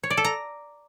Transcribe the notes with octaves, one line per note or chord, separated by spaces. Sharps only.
C#5
D5
A4
A#5